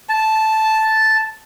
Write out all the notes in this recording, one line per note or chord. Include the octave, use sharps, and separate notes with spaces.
A5